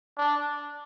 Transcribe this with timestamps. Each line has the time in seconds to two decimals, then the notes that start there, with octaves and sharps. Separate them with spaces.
0.18 D4